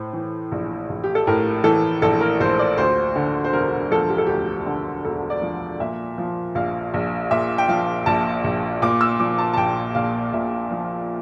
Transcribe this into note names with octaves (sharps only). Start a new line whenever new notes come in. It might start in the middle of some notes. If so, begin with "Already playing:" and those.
Already playing: A2 C5
E3
A#1
A#1
G4
A4
A2 A#4
E3 A4
A#1 A4
A#4
A#1 C5
D5
D2 C5
D3
C5
E1 A#4
F3 A4
G4
A4
D2 G4
D3
E1 A4
D5
F3
A#2 E5
F3
A#1 F5
A#1
A#2 E5
G5
F3 F5
A#1 A5
A#1
A#2 D6
E6
F3 D6
A5
A5
A#1 G5
A#1 F5
A#2 E5
F3